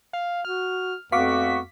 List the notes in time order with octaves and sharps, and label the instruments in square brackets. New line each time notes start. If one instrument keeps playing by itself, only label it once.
[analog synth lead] F5
[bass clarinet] F#4 [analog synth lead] F6
[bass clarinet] F2 [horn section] A3 B3 F#4 [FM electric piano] F5 C#6 D6 [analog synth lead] B6